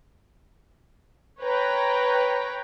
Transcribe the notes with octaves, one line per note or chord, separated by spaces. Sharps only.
B4 C#5 G5 A#5